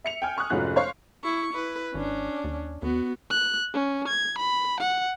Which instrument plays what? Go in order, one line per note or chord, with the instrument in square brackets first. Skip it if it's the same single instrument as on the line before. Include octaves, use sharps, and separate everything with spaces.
[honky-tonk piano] E5 C#7 F7
G5 G#5 F6
G#5 C#6 D#6 F#6
F1 G#2 C#4 F4 F#4 F#6
C5 C#5 F5 C#6 C7
[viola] E4 C#6
E4 B4
[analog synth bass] G#1 [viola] C#4 D4
[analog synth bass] D#2
[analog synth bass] D#2 [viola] B3 F#4
[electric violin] F#6
C#4
G#6
B5
F#5